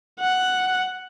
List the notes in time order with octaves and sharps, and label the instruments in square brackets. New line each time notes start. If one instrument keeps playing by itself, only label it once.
[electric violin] F#5